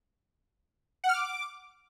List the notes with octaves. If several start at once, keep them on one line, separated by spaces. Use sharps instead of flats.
F#5
F6
D6